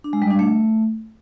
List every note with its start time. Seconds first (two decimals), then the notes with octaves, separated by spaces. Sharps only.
0.04 D4
0.13 G#3
0.22 G3
0.30 D4
0.39 A3